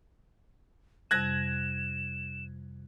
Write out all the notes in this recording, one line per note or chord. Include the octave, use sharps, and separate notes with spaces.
F2 C3 G3 F#6 G#6 A#6 E7